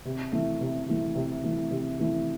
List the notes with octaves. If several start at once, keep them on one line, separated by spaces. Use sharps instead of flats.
C3
E3 A3
C3
E3 A3
C3
E3 A3
C3
E3 A3